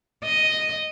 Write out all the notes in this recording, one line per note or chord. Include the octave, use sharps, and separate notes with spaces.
D#5